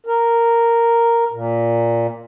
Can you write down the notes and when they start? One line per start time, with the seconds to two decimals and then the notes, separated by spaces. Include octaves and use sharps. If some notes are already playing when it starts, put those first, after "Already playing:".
0.06 A#4
1.32 A#2